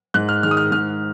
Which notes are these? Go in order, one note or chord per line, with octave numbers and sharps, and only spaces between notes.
G#2 F#6
F6
D#3 G#3 F6
D#6
F6
G#2 F6